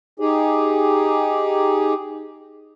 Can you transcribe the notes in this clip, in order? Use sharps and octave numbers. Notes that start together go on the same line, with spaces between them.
D#4 G4 G#4